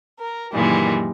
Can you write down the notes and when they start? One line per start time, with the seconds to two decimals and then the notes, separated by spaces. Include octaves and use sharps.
0.19 A#4
0.53 F#2 A#2 D#3 E3 G3 G#3